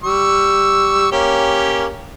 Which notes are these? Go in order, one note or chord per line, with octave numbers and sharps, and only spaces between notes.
G3 C#6 E6
A#3 C#4 G4